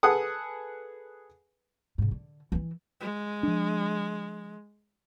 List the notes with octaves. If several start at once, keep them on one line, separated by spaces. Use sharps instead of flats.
G#4 A4 B4 F#5 D#6
G#2 C3
D3
E3 E4
G#3
F3 D4